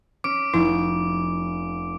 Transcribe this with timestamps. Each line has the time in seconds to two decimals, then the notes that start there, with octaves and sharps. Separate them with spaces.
0.24 C#4 D6 D7
0.54 F1 E4